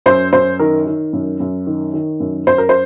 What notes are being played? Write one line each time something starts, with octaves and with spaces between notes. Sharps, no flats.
F#2 C5
F#2 C5
D#3 A#4
D#3
F#2
F#2
D#3
D#3
F#2
F#2 C5
A#4
C5